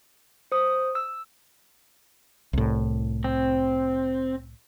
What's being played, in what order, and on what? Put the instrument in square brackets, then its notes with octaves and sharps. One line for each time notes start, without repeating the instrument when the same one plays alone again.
[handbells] C5 D#6
E6
[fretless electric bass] C2 A2
[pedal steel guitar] C4